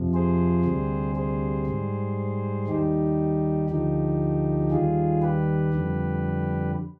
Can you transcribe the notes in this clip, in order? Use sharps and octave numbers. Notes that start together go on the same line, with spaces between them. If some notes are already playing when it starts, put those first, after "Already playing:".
Already playing: F2 C3 F3
G#4 C5
D2 C3 G3
G#4 C5
G#2 G3
D#2 D#3 G3 D#4 G4
D2 D3 F3 D#4 G4
D#2 D#3 G3 F4 G#4
G4 B4
F2 D3 G3